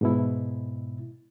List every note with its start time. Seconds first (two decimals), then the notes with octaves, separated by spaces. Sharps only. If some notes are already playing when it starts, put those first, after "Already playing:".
0.01 G#2 B2 E4